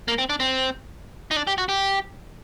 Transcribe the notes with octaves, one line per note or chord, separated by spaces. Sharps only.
A#3
C4
D4
C4
D#4
D4
G4
F#4
G4